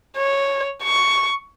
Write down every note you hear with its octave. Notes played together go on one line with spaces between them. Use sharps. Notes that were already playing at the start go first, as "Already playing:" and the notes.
C#5
C#6